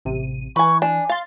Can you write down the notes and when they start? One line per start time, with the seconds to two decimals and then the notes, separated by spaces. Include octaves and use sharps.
0.05 A1 C3 D#7
0.56 E3 B4 G#5 C#6
0.82 D4 G#5
1.09 F5 C6 A6